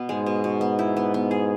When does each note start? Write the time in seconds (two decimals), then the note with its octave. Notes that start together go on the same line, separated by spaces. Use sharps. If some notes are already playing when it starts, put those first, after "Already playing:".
Already playing: B2 B3
0.09 G#2 G#3
0.26 B2
0.44 B2
0.61 B3
0.79 E4
0.97 B3
1.14 B3
1.31 G#4